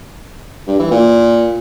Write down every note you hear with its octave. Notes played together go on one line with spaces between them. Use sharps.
G2
E3
A#2